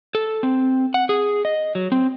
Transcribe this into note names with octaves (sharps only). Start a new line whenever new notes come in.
A4
C4
F#5
G#4
D#5
F#3
C4